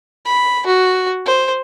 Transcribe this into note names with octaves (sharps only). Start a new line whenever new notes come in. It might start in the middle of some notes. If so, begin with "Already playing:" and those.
B5
F#4
C5